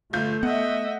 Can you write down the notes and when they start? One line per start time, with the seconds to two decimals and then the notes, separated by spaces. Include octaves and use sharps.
0.13 G1 A3 F4 G6
0.43 B3 D#5 E5 F#5